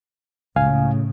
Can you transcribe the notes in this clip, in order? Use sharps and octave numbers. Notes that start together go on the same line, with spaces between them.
C#2 A2 C#3 F5 G#5